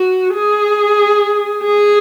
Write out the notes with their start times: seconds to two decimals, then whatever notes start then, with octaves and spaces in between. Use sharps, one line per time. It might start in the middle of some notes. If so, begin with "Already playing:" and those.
Already playing: F#4
0.33 G#4
1.63 G#4